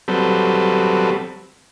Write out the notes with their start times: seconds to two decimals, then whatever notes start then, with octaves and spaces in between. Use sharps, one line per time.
0.08 F#3 G3 C4 A4 B4